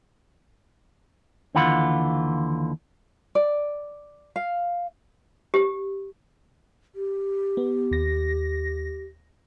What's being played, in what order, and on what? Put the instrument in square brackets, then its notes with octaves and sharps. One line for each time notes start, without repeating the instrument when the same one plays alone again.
[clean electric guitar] D#2 D3 E3 F4 F#5 B5
[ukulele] D5
F5
[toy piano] G4
[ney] G4
[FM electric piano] B3
D#2 A#6